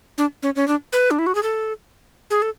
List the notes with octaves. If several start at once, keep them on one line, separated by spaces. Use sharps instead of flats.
D4
C#4
C#4
D4
B4
D4
E4
F#4
G#4
A4
G#4
A4